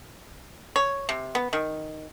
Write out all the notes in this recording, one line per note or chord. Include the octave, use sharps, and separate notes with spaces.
C#5
C3
B3
D#3